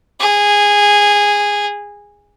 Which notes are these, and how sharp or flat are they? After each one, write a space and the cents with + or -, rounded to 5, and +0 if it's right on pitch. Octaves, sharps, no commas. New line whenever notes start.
G#4 -15